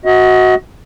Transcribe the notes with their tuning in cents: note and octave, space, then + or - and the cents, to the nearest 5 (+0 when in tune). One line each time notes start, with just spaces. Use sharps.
F#4 +0 D#5 +35